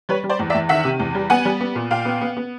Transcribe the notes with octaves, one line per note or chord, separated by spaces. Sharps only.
G3 B4 C#5
G3
C5 D5
E2
D5 E5
E2
D#3 E5 F#5
C3
E2
G3
B3 F#5 G#5
G3
B3
A#2
A#2 F5 G5
B3
B3
B3